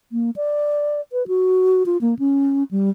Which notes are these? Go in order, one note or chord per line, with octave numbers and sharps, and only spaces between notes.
A#3
D5
B4
F#4
F4
A#3
C#4
G3